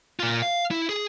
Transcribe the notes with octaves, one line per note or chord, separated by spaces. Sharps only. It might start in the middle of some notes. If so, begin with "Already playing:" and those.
A#2 F4
F5
E4
G#4